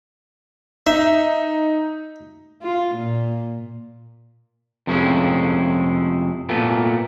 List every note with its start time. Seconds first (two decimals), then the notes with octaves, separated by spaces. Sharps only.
0.87 D#4 E5
2.62 F4
2.94 A#2
4.87 F2 C3 G#3 A3 C#4 E4
6.49 A#2 A3 B3